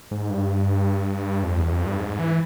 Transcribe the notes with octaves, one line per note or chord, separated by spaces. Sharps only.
G#2
G2
F2
E2
F2
G2
G#2
E3